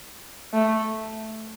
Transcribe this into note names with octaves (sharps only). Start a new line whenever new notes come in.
A3